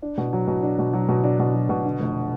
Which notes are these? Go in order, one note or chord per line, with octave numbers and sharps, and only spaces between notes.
D4
B2
F#3
B2
D4
B2
F#3
B2
D4
B2
F#3
B2
D3
F1